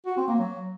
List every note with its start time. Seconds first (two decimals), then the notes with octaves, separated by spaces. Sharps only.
0.06 F#4
0.17 C4
0.28 A#3
0.39 F#3